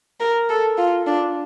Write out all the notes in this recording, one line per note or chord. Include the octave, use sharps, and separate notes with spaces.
A#4
A4
F4
D4